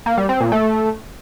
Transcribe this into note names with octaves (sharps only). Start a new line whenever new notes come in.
A#3
G3
C4
A#2
A3